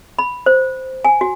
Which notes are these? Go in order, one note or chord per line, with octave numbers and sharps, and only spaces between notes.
B5
C5
G#5
F#4